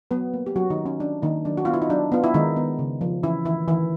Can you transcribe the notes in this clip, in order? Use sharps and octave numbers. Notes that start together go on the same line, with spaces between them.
F#3 B3 B4
A#3
G4
F#3 C#4 F#4
D#3 D#4
F#3
C#4
F#3 D4
D#3 A#3 D#4
F#3 D4
F#4
B3 F4
E4
D#4
F#3 D4
B3 F4
E4
D#3 G#3 D#4
B3
C#3
F3
E3 C#4 E4
D#3 E3 E4
D#3 E3 E4